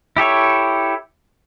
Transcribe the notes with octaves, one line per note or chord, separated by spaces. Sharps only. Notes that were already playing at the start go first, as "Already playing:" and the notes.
E4 G4 A4 C#5